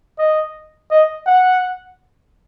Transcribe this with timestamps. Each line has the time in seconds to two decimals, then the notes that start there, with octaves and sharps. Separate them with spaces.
0.19 D#5
0.91 D#5
1.27 F#5